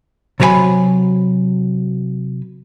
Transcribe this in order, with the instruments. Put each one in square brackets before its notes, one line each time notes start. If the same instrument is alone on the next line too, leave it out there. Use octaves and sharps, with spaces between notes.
[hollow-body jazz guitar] C3 F#3 A#4 B4 G#5 B5